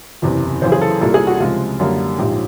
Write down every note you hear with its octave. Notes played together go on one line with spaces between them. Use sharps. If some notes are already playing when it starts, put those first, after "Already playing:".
F#1 E2 C3
F#1 F#2 C#3 E3 C5
G#4
A4
C2 A#2 G3 A#3 A4
G#4
F#4
C#2 C3 F3 G#3 F4
F#2 D3 G3 A#3
A#1 G#2 F3 G4